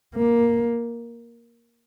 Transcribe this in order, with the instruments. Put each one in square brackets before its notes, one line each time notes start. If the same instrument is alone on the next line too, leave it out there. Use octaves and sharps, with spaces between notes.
[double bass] A#3